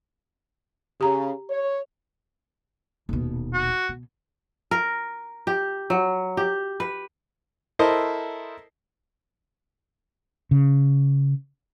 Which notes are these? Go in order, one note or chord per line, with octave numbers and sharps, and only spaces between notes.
C#3 G4 A#5
C#5
D#1 B2
F#4
B2
A#4
G4
F#3
G4
B4
E4 A4 A#4 C5 D#5
C#3